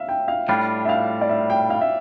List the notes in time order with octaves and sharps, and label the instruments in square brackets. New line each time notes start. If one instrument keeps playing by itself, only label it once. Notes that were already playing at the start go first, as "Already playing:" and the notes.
Already playing: [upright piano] E5 F5
G5
F5
[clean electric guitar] A2 G3 D4 F4 [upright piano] G5
[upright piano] E5
F5
D5
E5
G5
F5
E5